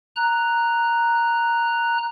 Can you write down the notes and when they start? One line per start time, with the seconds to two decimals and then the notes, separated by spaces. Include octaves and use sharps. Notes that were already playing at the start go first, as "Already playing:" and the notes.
0.16 A#5 F#6